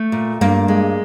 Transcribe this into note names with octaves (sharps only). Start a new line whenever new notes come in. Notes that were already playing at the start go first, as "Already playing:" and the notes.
Already playing: A3
A#2
G2 A#3
G#3